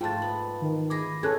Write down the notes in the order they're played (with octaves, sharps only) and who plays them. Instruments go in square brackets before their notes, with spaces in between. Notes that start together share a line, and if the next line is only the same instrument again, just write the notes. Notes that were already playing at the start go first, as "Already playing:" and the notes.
[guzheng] G#2 A3 [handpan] F4 [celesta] G5 A5 A6
[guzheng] B3
[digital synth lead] D#3
[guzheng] E4 G#4 [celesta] D6 A#6
[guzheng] B2 [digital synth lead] C#4 [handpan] G#4 A4 [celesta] A5 F#6 G#6